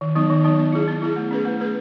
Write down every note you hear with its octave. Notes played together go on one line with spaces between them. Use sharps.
D#3
F#3 B3 D#4
D#3
F#3 B3 D#4
B3
E4 G#4
B3
E4 G#4
A3
C#4 G#4 B4
A3
C#4 G#4 B4